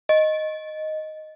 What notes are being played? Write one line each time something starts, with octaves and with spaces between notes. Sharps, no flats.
D#5